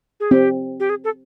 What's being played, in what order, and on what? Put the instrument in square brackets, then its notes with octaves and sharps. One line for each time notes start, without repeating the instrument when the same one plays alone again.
[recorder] G#4
[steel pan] C4 [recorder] G4
[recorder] G4
G#4
A4